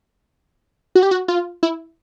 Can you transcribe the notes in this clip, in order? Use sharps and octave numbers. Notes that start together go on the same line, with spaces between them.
F#4
G4
F#4
F4
E4